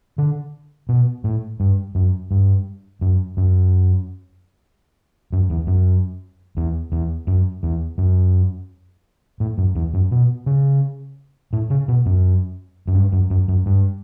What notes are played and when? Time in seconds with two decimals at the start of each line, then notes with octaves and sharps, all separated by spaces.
0.18 D3
0.89 B2
1.24 A2
1.60 G2
1.95 F#2
2.31 G2
3.01 F#2
3.37 F#2
5.32 F#2
5.50 E2
5.67 F#2
6.57 E2
6.92 E2
7.27 F#2
7.63 E2
7.98 F#2
9.40 A2
9.58 F#2
9.75 E2
9.94 F#2
10.11 B2
10.46 C#3
11.53 A2
11.70 C#3
11.88 B2
12.06 F#2
12.87 F#2
12.95 G2
13.12 F#2
13.30 F#2
13.48 F#2
13.66 G2